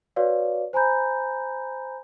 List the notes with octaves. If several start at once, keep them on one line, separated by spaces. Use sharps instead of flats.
F#4 B4 C#5 D5 F5
C5 G#5 A#5 B5 G6